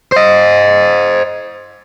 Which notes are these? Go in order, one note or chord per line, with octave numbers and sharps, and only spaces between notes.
C5 D#5